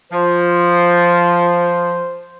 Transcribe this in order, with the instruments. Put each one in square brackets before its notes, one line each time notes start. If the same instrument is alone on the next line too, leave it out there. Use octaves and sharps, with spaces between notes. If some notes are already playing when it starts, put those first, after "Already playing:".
[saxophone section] F3 [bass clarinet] C5